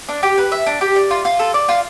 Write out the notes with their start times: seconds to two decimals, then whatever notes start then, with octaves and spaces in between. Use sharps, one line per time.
0.09 D4
0.23 G4
0.38 B4
0.52 E5
0.66 D4
0.81 G4
0.96 D5
1.11 F4
1.25 F4
1.39 A4
1.54 D5
1.69 F4